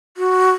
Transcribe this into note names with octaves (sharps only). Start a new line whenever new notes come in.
F#4